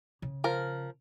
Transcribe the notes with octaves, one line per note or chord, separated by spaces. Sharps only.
C#3
F3 A#4